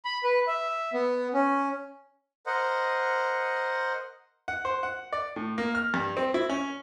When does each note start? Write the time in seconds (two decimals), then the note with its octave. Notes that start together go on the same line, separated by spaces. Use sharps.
0.05 B5
0.24 B4
0.47 E5
0.94 B3
1.34 C#4
2.46 A#4 C5 D#5 F#5
4.48 F#5
4.65 C5
4.83 F#5
5.13 D5
5.36 A2
5.58 A#3
5.75 F6
5.94 G2
6.17 C4
6.34 E4
6.50 C#4